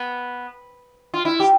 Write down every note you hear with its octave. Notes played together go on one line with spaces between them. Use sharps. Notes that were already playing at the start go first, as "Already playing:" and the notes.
Already playing: B3
F4
E4
G4